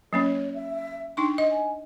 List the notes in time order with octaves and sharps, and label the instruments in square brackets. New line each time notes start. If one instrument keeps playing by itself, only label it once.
[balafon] F#3 A#3 C#4 [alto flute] C#5
[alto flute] E5
[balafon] D4 D#4 C6 [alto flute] G5
[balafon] D#5
[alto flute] G#5